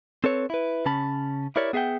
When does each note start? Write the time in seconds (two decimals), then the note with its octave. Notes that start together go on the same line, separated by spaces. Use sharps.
0.24 C4 A4 B4 C#5
0.50 E4 B4
0.86 C#3 C#4 A5 B5
1.56 E4 G4 A#4 C#5 D5 E5
1.73 B3 G#4 E5 F#5 G5